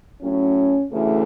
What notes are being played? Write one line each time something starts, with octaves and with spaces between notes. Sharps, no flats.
A2 F#3 C#4
D2 C#3 E3 A3